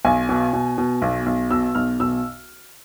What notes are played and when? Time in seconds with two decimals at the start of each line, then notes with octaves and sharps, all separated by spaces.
0.05 B1 G#5
0.29 B2
0.53 B2
0.78 B2
1.02 B1
1.26 B1
1.51 B2 E6
1.75 B1 F6
2.00 B2 E6